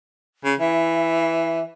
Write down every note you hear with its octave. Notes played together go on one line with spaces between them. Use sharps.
C#3
E3 E5